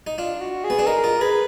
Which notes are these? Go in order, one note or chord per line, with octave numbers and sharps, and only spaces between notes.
D#4
D4 F4
F#4
G#4
B3
D4
D#4 A#4
F4
G#4 B4